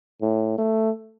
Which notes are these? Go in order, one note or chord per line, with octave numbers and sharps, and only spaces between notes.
A2
A3